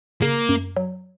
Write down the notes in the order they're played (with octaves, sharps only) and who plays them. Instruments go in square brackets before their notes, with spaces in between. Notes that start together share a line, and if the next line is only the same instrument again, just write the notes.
[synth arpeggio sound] C#3 [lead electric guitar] A#3
[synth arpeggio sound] F#2
F#3